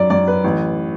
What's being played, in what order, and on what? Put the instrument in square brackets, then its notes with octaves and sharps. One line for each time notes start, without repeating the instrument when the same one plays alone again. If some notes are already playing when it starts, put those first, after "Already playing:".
Already playing: [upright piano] F#2 D5
F#2 D5
B4
A1